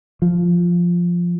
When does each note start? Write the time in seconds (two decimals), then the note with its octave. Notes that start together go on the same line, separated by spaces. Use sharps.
0.22 F3